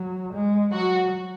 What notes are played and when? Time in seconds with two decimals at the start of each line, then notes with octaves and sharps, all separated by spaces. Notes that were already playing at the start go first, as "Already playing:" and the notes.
Already playing: F#3
0.33 G#3
0.73 F#3 F#4